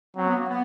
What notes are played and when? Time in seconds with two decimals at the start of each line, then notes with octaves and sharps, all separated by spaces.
0.17 F#3 C4
0.27 B3
0.38 A#3
0.48 B3